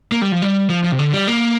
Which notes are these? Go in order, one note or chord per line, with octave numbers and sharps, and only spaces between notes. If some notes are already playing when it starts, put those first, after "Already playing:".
A#3
G3
F3
G3
F3
F3
C3
D3
G3
A#3